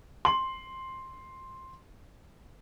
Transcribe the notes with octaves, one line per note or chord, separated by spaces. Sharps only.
C6 F#7